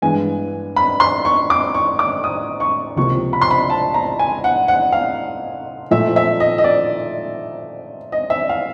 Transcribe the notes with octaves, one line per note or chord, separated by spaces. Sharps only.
G2 E3 G#3 B3 G#5
B5
C6
C#6
D6
C#6
D6
D#6
C#6
C#2 C3 F3 A#3 C#6
B5
C6
B5
A5
A#5
G#5
F#5
F#5
F5
A#2 F3 A3 E5
E5
D#5
D#5
D5
D#5
E5
F5